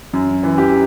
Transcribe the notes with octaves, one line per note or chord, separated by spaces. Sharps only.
F#2
E3
G4